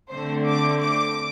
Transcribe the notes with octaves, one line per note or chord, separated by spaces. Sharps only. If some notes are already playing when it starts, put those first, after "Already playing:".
D3 A3 C4 C5
D6
D6